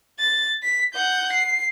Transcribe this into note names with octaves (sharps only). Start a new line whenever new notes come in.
A6
B6
F#5 G6
C7